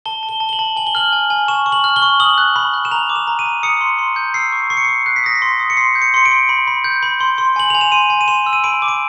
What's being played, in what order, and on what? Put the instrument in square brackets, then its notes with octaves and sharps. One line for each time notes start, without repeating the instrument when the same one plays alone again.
[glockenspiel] A5 G7
A5
G7
A5
G7
F#7
A5
G#5 F#7
G7
F6 F#7
G#5
G#5
C#6 E7
C#6
F#7
F6
G7
C#6
D#6 F#7
F#6
B5
F#6
E7
A#5 F7
D6
E7
A#5
D#7
A#5
D#6 C#7
C6
C6
G6
E6 C7
C#6
C#6 C7
C#7
C#6 C7
F#6 C7
B6
D#6 A#6
B6
C6
D#6
C#7
C6 C7
G6
C#7
C6 C#7
D7
C6
B5
B5
G6
B5
C6
C6
G#5 F#7
G#5 F7
E7
C6 D#7
G#5
D#7
C6 E7
E6
D#7
B5 D7
D6
D7